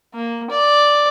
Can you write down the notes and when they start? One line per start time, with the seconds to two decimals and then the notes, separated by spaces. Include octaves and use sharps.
0.15 A#3
0.50 D5